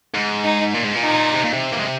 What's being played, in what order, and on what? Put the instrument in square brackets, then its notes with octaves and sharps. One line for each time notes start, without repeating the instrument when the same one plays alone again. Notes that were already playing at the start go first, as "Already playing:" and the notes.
[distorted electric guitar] G#2
[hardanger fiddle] D#4
[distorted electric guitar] A#2
G#2
A#2
[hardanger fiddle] D#4
[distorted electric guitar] C3
A#2
C3
A#3
G#3